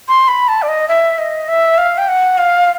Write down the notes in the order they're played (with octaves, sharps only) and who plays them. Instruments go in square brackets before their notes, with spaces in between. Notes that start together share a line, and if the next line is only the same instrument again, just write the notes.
[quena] C6
B5
A5
D5
D#5
E5
D#5
E5
F5
G5
F#5
F5